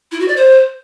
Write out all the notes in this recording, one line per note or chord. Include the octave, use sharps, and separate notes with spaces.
E4
F#4
D5
C5